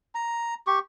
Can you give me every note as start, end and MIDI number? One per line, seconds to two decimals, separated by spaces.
0.15 0.54 82
0.67 0.79 67
0.67 0.79 85